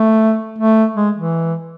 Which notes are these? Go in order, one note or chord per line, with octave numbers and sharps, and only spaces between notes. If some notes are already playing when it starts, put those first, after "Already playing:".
Already playing: A3
A3
G#3
E3